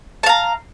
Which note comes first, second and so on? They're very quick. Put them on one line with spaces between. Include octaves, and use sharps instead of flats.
A5 F5 A#5